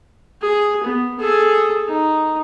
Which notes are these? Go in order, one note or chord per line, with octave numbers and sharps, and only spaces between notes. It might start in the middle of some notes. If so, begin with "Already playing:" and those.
G#4
B3
G#4 A4
D#4